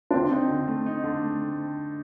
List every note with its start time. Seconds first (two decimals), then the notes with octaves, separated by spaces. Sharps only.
0.11 D4
0.14 D3 C4
0.32 D#4
0.50 D3
0.67 A3
0.86 D#4
1.04 D3
1.22 A3